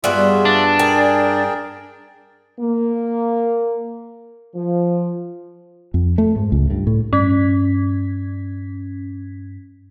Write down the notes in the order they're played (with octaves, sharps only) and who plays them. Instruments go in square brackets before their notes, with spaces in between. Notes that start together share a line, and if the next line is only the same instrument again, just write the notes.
[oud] G2 D5 [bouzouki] B3 F#4 G#4 [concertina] F4 E5
[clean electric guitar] D4
[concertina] G#4 A#4 G5 [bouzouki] G#5
[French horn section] A#3
F3
[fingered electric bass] F2
A3
G#2
C#2
G2
A2
[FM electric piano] G2 G#6 B6 [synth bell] C#4